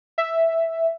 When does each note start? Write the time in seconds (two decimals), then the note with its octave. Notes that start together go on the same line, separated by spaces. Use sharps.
0.18 E5